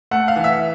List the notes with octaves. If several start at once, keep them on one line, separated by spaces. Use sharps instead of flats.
A3 F#5
F5
E3
E5